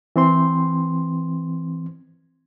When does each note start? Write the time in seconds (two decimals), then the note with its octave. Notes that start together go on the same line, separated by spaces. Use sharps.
0.16 E3 C4 C6